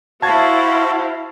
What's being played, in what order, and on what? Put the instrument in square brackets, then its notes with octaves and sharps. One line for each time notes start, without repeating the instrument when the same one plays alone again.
[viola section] E4 C5 F5 [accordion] F#4 [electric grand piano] A5 G#6 A6